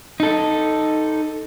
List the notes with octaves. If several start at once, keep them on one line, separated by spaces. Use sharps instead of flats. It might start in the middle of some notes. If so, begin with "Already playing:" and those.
D#4 A4